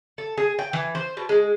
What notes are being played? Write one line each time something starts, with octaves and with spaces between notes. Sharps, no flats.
A4
G#4
G5
E3
C5
B2
G#3